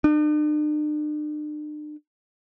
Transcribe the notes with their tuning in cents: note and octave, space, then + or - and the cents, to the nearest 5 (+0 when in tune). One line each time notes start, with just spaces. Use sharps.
D4 +45